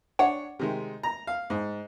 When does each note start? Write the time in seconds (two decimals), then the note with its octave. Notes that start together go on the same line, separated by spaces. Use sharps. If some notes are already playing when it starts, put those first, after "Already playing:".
0.19 D4 C#5 F#5
0.59 C3 D#3 G#3
1.03 A#5
1.27 F5
1.50 G#2